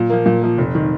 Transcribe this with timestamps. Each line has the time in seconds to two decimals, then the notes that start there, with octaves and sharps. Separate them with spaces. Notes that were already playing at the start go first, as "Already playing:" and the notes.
Already playing: A#2
0.10 F3 A#3
0.26 A#2
0.42 F3 A#3
0.58 F1
0.75 D#3